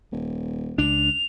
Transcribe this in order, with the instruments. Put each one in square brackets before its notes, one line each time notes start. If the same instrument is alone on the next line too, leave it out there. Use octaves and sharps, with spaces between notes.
[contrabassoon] D#1
[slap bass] C#2 D4 [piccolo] F7